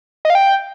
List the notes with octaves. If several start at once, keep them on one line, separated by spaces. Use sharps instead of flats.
D#5
F5
G5